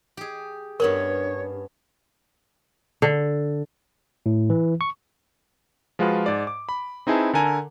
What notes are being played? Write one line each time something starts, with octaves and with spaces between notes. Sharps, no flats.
G4 G#4
G2 B3 C#4 A#4 C#5
D3
A2
E3
C#6
F3 G#3 F4 F#4 B4
G#2 D5
D6
B5
C4 D#4 E4 G#4 B4 A5
D3 A4 A#4 G#5 A#5